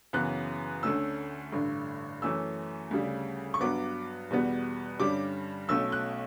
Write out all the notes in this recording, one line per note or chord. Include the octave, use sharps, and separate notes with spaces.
F#2 C#3 E3 B3 F#6
D2 D3 A3 C#4 E6
A1 G2 D3
F#2 E3 A3 C#4 E6
D2 C#3 G3
C#6
G2 F#3 B3 D6
E2 B2 G3 B3
G2 D3 G3 C#4 D6
B1 B2 A3 C#4 E6
F#6